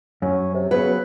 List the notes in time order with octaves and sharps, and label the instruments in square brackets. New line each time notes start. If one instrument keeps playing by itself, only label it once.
[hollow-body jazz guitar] F#2 [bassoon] C#4
[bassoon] C3
[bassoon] C#3 [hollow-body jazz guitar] F#3 B3 [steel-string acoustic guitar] B4